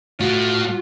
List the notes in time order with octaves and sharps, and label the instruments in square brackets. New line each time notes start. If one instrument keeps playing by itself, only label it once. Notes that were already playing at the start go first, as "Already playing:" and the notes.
[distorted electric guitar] A2 A3 [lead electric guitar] F4 [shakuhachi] F#4